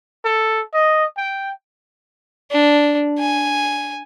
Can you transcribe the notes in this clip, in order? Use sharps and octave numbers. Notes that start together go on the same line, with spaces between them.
A4
D#5
G5
D4
G#5